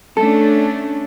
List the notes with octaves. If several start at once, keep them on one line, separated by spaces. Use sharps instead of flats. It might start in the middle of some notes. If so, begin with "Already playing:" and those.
A3 C#4 D4 A4